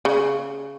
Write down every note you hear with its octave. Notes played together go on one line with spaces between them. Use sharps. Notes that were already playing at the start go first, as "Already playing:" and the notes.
C#3